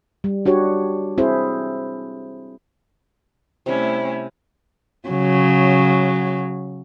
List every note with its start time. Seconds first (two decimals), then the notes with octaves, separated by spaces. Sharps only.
0.24 G3
0.46 D4 F#4 G4 C#5
1.18 C4 E4 G#4 C5
3.66 C3 G3 A3 C#4 E4
5.09 C#3 F#3